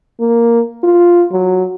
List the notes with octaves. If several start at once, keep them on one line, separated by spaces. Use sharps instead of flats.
A#3
F4
F#3